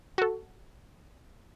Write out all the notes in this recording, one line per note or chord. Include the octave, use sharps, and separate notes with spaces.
F#4 A4